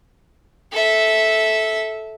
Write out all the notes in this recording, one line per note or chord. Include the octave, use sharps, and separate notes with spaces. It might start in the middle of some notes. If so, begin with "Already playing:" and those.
A4 E5